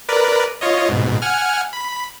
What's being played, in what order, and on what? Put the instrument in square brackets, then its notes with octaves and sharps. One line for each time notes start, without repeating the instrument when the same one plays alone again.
[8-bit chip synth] A#4 B4 D5
F4 C#5 D#5
G#2 B2
F#5 G#5 F6
B5